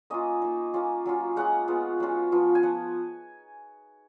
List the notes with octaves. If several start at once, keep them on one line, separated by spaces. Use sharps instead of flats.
A#3 C#4 F4 D#5
A#3 D#4
A#3 C#4 F4
F#3 C#4 F4
G#3 C#4 F4 F#5
G#3 B3 F4
F#3 C#4 F4
F3 B3 F4
G#5
F3 F#5